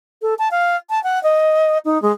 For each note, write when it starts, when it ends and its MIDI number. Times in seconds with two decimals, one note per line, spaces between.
0.22 0.34 69
0.39 0.49 81
0.51 0.76 77
0.90 1.02 81
1.03 1.21 78
1.23 1.78 75
1.85 2.01 63
2.02 2.12 56